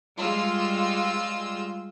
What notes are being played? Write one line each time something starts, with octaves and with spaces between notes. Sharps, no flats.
G3 G#3 F4 E6